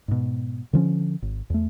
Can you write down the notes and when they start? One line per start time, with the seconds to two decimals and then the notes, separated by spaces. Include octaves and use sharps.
0.08 G#2 B2
0.73 D3 F3 C#4
1.22 G#1
1.50 E2 A3